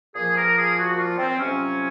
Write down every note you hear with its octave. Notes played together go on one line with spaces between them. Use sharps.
A#2 F3 G#4
A#4
G#4
F#4
F4
C4
F2 C3 F#3 C#4